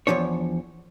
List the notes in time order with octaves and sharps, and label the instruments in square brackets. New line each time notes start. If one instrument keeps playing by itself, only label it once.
[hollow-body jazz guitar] E2 E3 F3 D4 C#5